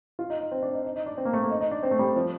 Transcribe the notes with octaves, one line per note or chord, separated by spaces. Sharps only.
F4
D#4
D#4
C4
D4
D#4
D#4
D#4
D4
C4
A#3
A3
A#3
D#4
D#4
D4
C4
A3
G3
F3